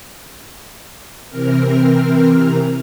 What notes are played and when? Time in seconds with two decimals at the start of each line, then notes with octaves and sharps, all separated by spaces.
1.28 C3 E3 C4 A#4 F6